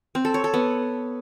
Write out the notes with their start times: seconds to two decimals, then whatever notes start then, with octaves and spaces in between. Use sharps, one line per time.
0.15 C4
0.25 A4
0.34 C#5
0.44 A4
0.54 B3